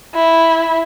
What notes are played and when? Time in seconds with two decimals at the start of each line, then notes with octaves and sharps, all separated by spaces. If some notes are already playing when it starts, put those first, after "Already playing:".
0.15 E4